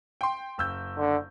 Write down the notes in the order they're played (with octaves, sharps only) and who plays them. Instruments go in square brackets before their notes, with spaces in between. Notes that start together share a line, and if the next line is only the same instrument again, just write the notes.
[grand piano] G5 C6
F#1 E6 G6
[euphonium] D3